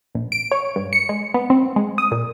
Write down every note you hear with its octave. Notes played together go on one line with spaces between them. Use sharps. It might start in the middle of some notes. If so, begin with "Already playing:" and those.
A#1
D7
C#5
G2
C#7
G#3
B3
C4
G#3
D#6
A#2